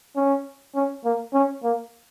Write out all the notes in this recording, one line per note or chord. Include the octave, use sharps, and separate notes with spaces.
C#4
C#4
A#3
C#4
A#3